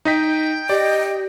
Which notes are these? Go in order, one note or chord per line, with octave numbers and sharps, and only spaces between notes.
D#4 D#5 G5 B6
G4 D5 D#5